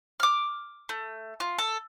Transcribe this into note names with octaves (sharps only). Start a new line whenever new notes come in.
D6 F6
A3
F4
A4